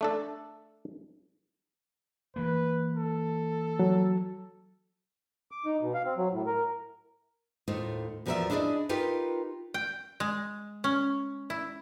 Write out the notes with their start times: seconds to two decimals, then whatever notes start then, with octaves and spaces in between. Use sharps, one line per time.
0.01 A3 D4 A4
2.36 E3 A#3 B4
2.97 A4
3.79 F#3
5.51 D6
5.65 D#4
5.81 B2
5.94 F5
6.06 C4
6.17 F#3
6.32 A2
6.46 A#4
7.68 D#2 A2 D#4 F4 C5
8.26 E2 F3 F#4 A#4 D5 E5
8.50 D4 E4 G#4 A4 D5 D#5
8.89 D#4 F4 G4 A#4 B4
9.74 G5
10.20 G#3
10.84 C#4
11.50 E4